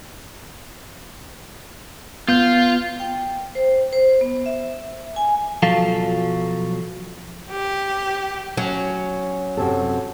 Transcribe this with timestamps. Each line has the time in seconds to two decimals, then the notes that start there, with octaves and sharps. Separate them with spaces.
2.28 B3 F4 G6
3.00 G5
3.55 C5
3.93 C5
4.21 B3
4.46 E5
5.16 G#5
5.63 B1 F3 F#3 A4 F5
7.51 G4
8.57 F#3 C#4
9.57 F#2 C3 A4